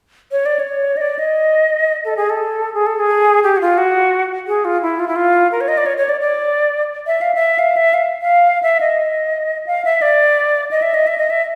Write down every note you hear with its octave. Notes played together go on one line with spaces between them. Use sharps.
C#5
D5
C#5
D#5
D5
D#5
A4
G#4
A4
G#4
A4
G#4
G4
F#4
F4
F#4
G#4
F4
E4
F4
E4
F4
A#4
C#5
D#5
D5
C#5
C#5
D5
D5
E5
F5
E5
F5
E5
F5
F5
E5
D#5
F5
E5
D5
D#5
E5
D#5
E5
D#5
E5